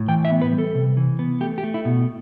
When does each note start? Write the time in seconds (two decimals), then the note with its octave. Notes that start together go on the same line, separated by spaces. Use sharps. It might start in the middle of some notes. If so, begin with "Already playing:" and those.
Already playing: A2
0.08 E3 G5
0.25 E5
0.30 B3
0.42 B4
0.53 G3
0.58 A4
0.75 C3
0.97 E3
1.19 B3
1.41 A3 G4
1.58 G4
1.64 A3
1.74 E4
1.85 B2